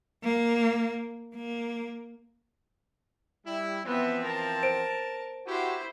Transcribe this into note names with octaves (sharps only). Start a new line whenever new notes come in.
A#3
A#3
G3 E4
E3 F3 B3 C4 E5
A#4 A5
C5 D7
E4 F#4 G4 C5